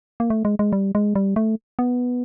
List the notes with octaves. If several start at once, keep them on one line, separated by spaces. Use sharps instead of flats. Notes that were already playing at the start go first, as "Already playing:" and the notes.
A#3
A3
G#3
G#3
G3
G#3
G3
A3
B3